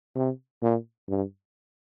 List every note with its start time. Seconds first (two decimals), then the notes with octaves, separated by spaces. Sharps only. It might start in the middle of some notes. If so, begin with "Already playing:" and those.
0.16 C3
0.62 A#2
1.08 G2